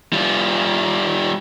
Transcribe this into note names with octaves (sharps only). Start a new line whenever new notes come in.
G3 F4